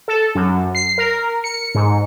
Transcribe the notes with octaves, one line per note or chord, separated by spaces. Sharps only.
A4
F#2
C7
A#4
C#7
G#2